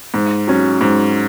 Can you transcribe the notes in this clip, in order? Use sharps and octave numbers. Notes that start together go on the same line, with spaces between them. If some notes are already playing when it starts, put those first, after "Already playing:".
G#2
F#3 C#4
G#2